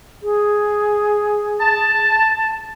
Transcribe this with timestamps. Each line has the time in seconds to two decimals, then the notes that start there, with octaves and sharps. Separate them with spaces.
0.23 G#4
1.60 A5